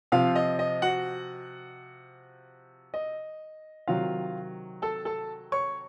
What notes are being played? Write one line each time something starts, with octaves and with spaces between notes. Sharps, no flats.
C3 F3 F4 F5
D#5
D#5
F#4 F#5
D#5
C3 D#3 F#3 F4 F5
A4 A5
A4 A5
C#5 C#6